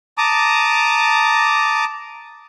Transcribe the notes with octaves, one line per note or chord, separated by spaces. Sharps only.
A5 A#5 D6 D#6